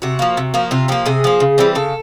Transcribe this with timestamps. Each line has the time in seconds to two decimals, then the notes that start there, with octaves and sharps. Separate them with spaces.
0.02 C3 F#4
0.19 F3 A#3
0.37 C3
0.54 F3 A#3
0.71 C3 F4
0.88 F3 A#3 G4
1.06 C3 G#4
1.24 F3 A#3
1.40 C#3
1.58 E3 G3 C4
1.75 C#3 A4